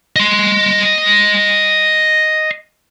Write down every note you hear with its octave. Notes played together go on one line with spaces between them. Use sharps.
D#5 C6